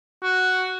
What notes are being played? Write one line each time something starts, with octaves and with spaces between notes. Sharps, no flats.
F#4